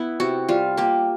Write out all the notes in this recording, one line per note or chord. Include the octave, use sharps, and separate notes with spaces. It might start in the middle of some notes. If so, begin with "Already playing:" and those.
Already playing: B3 E4
C3 F#4
G3 F4
A#3 G4